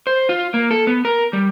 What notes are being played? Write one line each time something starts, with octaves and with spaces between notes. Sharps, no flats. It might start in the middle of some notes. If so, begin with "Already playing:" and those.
C5
F4
A#3
A4
B3
A#4
G3